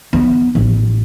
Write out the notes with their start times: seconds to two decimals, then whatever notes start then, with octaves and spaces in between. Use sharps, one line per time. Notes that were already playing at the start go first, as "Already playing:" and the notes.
0.13 B3
0.55 A1